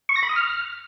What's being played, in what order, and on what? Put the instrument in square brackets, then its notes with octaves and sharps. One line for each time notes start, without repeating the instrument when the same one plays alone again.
[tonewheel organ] C#6
A#6
B5
D#6
F6